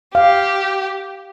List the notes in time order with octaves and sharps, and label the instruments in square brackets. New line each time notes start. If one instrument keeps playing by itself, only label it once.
[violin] G4 [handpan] F5